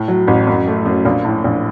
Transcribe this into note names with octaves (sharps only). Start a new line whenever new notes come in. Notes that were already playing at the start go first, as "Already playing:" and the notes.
Already playing: A2
F#3
A1
F#2
A3
F#2
A#1
A2
A#1